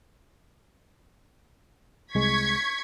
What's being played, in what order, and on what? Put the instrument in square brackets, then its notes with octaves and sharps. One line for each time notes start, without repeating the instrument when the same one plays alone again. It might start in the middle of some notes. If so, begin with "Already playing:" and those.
[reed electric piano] C2 G#3 [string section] C#6 G#6 B6